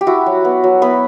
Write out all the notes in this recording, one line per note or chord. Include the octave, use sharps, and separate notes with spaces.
G4
E4 F#4
F#3
B3
F#3
B3 E4 B4